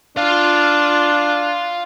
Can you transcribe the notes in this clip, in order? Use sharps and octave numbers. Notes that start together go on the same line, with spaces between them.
D4 F4 F5